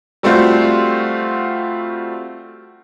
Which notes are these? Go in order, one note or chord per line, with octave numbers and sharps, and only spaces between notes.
G3 A3 C4 F4 F#4